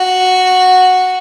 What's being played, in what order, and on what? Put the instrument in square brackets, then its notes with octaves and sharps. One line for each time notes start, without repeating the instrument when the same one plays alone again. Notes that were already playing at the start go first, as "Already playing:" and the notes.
Already playing: [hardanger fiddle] F#4